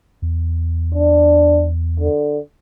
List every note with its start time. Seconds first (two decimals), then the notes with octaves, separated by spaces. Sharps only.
0.22 E2
0.94 D4
2.00 D3